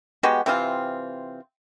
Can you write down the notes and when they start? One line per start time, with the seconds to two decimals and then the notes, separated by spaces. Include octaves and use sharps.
0.23 G#3 B3 F#4 G4
0.46 C3 E3 C4 F4